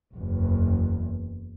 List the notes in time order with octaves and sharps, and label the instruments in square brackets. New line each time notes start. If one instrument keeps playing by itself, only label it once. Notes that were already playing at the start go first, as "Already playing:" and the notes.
[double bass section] F#1 E2